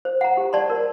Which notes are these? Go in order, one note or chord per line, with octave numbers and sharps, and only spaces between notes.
C5
F#5 A#5
G4
D5 A5 C6
A#4